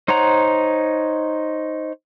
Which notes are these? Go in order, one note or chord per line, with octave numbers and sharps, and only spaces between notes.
D#4 C5 C#5 F#5 A#5